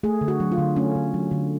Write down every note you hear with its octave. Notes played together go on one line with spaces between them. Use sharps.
A3 G#4
D3
F#4
F#3
F4
D3
A3 C#4
D3
F#3
D3